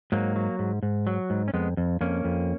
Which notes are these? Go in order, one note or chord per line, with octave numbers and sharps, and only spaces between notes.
G#2 F#3 A#3
F#3
G#2
G#2
F#3
G#2
C#4
F2 G#3 B3
F2
F2 A#3 C#4
F2